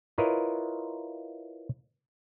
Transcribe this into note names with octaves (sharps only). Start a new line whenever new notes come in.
E4 F4 A#4 B4 C#5 D#5